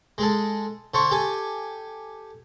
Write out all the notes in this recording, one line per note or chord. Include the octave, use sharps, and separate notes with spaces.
G#3 G#4 A4
D3 A4 C5 C#6
G4 A4 G#5